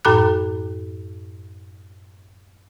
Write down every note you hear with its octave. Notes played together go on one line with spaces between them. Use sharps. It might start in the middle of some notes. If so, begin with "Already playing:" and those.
F#2 A2 A4 B5 D6 F#6